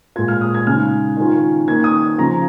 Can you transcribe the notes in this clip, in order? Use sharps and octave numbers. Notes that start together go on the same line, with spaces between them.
A#2 G#3 F4 G#6
F6
D#6
G#6
C#3 G#3 D#4 F6
D#3 C#4 F4
D#3 A#3 D#4 G#6
D#6
C#3 F3 C#4 F4 A#5